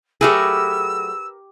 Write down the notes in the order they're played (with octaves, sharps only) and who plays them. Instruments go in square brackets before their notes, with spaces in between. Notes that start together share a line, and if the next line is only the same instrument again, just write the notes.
[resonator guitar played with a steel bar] F#3 A3 G#4 [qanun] G4 A#4 B4 [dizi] E6